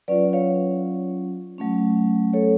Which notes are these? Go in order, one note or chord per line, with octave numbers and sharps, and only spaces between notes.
F#3 C#4 F4 B4 D5
C#5 F5
F#3 A3 C#4
A4 C#5